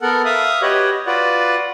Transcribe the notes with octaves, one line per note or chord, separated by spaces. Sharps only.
B3 A4 A#4 F#5
E5 F5 D#6
F#4 G4 B4 C#5 D#5 F#5
F4 F#4 B4 D5 F#5